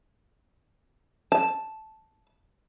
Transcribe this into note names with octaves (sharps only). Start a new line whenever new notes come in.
A5